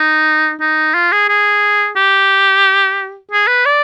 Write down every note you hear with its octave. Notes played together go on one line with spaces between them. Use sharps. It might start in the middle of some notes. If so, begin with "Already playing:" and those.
Already playing: D#4
D#4
F4
G#4
G#4
G4
G#4
B4
D5